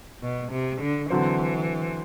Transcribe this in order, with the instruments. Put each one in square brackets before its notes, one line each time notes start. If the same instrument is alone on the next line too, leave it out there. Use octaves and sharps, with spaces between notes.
[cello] B2
C3
D3
[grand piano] D3 F#3 C4 [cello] E3